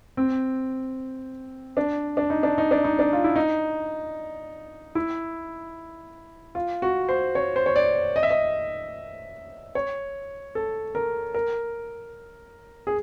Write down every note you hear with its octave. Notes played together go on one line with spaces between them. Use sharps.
C4
D4
D4
D#4
D4
D#4
D4
D#4
D4
F4
E4
D#4
E4
F4
F#4
C5
C#5
C5
C#5
D5
D#5
E5
D#5
C#5
A4
A#4
A#4
G#4